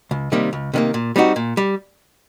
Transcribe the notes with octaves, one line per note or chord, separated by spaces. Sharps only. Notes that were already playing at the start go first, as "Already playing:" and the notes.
C#2
C3 D#3 G3 A#3
C#2
C3 D#3 G3 A#3
A#2
G3 C4 D#4 F#4
A#2
G3